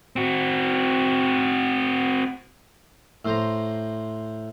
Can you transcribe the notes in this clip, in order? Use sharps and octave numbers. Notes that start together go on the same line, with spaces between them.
C4 F#4
A2 C5 A#5